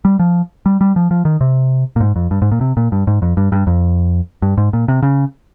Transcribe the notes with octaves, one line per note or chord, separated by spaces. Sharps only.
G3
F3
G3
G3
F3
F3
D#3
C3
A#2
G#2
F2
G2
G#2
A#2
C3
A#2
G2
G#2
F2
G2
G2
F2
G2
G#2
A#2
C3
C#3